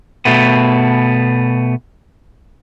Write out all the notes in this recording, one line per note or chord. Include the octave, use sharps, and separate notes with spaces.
B2 A3 B3